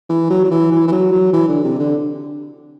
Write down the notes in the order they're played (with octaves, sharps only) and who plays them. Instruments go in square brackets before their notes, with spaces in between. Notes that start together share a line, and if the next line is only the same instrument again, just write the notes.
[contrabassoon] E3
F#3
F#3
E3
E3
E3
F#3
F#3
E3
D3
C3
D3